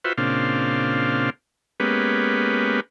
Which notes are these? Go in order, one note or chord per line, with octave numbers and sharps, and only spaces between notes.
F4 F#4 B4 C5 E5
A#2 C#3 C4 D4 F5
G#3 A#3 B3 C#4 G4 B4